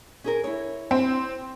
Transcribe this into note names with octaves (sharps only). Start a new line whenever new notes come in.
C#4 G#4 A#4
E4 C#5
C4